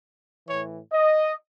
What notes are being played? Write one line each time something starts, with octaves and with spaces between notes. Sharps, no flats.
A2 E3 C#5
D#5